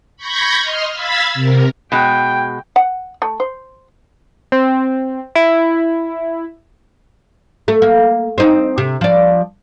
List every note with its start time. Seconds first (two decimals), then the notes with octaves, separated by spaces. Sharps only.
0.17 B5 C#6 G6 G#6 A#6
0.61 D#5 C6 F6
0.92 F5 B5 E6 G#6 A6 B6
1.34 C3 A#4
1.92 B2 G#3 G5
2.76 F#5
3.22 A3
3.40 C5
4.52 C4
5.35 E4
7.68 A3
7.82 A#3
8.38 C4 D#4
8.78 C3
9.01 F3 D5